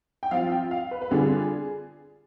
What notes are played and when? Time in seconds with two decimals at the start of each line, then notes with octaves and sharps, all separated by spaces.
0.23 G5
0.31 F3 C4 F4 F5
0.52 G5
0.71 F5
0.91 B4
1.02 B4
1.11 D3 G3 D4 F4 G#4